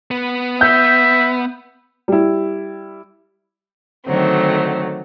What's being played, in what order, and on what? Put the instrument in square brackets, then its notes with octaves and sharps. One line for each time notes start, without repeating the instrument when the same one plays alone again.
[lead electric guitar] B3
[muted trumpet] E5 [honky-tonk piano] G6
[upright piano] G3 E4
[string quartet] D3 D#3 F#3 A3 C4